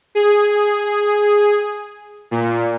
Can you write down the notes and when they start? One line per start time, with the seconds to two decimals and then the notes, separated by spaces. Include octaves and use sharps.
0.15 G#4
2.31 A#2